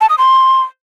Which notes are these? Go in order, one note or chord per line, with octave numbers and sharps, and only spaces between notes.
A5
D#6
C6